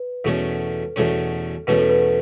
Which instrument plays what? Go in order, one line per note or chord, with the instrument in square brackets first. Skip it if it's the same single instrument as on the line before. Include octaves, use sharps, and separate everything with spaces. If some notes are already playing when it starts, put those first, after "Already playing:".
Already playing: [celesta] B4
[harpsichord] E2 B2 A3 C#4 [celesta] A4
[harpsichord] E2 B2 A3 C#4
[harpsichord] E2 B2 A3 C#4 [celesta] B4
[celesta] A4
B4